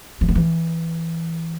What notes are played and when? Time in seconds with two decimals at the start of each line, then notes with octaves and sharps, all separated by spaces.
0.21 E3
0.29 D#3
0.35 E3